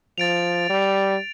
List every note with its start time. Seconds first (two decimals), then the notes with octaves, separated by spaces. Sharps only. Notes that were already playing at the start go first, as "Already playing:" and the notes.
0.18 F3 A6 D7 F7
0.69 G3